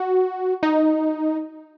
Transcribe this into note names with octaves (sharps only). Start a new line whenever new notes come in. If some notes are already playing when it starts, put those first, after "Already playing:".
Already playing: F#4
D#4